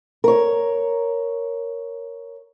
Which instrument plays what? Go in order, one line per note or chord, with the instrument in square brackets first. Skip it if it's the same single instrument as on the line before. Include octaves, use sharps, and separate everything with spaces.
[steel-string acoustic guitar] A#4 C#5